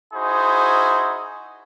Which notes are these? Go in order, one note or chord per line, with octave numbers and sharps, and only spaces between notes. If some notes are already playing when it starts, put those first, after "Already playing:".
D#4 E4 F#4 G#4 C5